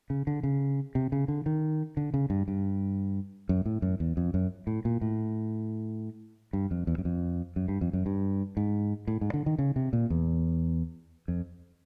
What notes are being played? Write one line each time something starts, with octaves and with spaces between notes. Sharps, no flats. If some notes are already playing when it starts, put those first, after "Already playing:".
C#3
D3
C#3
C3
C#3
D3
D#3
D3
C#3
G2
G2
F#2
A2
F#2
E2
F2
F#2
A2
A#2
A2
G2
F2
E2
F#2
F2
F#2
G2
F2
F#2
G2
G#2
A2
G#2
D3
D#3
C#3
C3
A#2
E2
F2